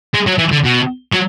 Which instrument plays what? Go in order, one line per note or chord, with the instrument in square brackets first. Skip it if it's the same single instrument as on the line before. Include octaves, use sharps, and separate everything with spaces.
[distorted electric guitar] G#3
F#3
E3
D3
B2
F#3